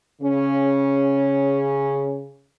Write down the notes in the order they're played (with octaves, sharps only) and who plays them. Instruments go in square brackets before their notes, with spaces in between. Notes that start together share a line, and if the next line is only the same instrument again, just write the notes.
[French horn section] C#3 C#4